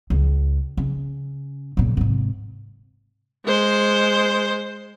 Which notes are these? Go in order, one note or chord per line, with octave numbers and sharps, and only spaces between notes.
C#2
C#3
A#2 C#3
G#2 C3
G#3 C5